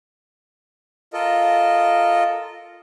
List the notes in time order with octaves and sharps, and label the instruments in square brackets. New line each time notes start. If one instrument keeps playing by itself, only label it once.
[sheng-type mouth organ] F4 A4 A#4 D#5